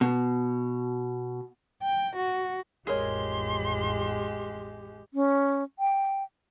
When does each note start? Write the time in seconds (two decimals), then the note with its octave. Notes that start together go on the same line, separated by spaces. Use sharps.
0.01 B2
1.83 G5
2.16 F#4
2.87 A1 F2 G#3 G4 G#4 A#4 C#5 C6
5.14 C#4
5.79 G5